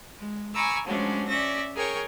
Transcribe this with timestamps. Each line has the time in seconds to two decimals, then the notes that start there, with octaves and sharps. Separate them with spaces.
0.17 G#3
0.55 G#5 A#5 B5 C#6 D6 E6
0.87 F3 F#3 G#3 A3 C#4 D4
1.28 C#4 D5 E5 A#6
1.75 G#4 A#4 C#5 G5 C#6